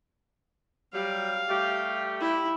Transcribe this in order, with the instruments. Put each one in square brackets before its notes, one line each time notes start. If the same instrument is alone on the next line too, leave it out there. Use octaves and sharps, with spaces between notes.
[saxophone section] F#3 G3 [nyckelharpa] F5
[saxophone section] G3 A3 G4
[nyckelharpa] E4